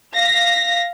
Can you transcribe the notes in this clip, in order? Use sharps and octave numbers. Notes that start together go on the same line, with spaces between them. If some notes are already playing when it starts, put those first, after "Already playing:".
F5 A#6 B6